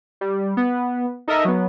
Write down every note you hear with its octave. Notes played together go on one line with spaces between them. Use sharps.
G3
B3
D#4 A4 A#4 D#5 E5
F#3 B3